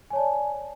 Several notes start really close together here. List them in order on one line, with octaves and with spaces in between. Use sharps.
G#5 C#5 A5 D5